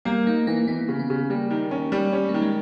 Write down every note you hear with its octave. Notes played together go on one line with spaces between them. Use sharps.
G3 A#3
A#3 D#4
E3 A#3
E3 B3
C#3
B3
C#3
G3 A#3
D#3
C#4
G3
C#4
A#3
D#3
G#3